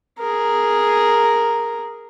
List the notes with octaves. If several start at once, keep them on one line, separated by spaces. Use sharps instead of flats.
G#4 A#4